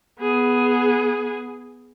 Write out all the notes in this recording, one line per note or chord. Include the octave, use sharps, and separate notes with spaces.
B3 G#4